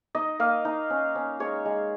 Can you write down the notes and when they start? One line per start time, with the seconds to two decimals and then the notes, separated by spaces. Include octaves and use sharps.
0.15 D#4 D#5
0.39 A#3 F5
0.65 D#4
0.90 C#4
1.15 C#4
1.40 G#3 C#5
1.65 G#3